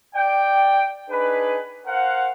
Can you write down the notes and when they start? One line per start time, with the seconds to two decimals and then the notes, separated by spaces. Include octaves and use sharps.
0.16 D5 G5
1.10 D4 D#4 G#4 B4
1.86 A#4 C5 F5 F#5